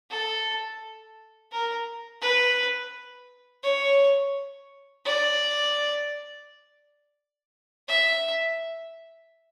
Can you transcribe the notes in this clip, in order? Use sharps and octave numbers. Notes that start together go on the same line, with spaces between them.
A4
A#4
B4
C#5
D5
E5